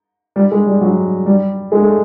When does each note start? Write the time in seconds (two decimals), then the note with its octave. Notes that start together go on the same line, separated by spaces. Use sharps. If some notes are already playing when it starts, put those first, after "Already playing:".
0.36 G3
0.51 G#3
0.66 G3
0.81 F#3
1.26 G3
1.72 G#3
1.82 A3